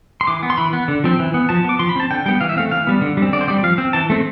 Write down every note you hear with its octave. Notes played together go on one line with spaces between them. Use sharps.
C6
E3 D6
B3
C6
E3 B5
B3
D3
F3 C4
E3
B3
F3 A5
B3 D6
F3 C6
B5
C4 A5
D3 G5
G3 B3 G5
E3 F5
E5
A3 C4 F5
E3 F5
G3 B3
D3
G3
C4
D3 D5
C5
G3 C4 D5
F3 F5
C4
E3 A5
A3 C4